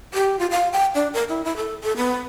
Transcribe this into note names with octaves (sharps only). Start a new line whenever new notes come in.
G4
F4
F5
G5
D4
A#4
E4
E4
A4
A4
B3